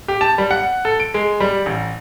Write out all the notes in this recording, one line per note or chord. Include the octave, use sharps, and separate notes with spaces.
G4
A5
G3
F#5
A4
D7
G#3
G3
A1